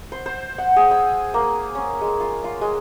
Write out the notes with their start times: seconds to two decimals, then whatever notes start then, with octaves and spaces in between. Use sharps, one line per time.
0.12 C5
0.26 C5
0.58 F#5
0.76 G#4
0.91 E6
1.34 A#3
1.75 C#4
2.01 G#3
2.20 F4
2.44 F4
2.61 G#3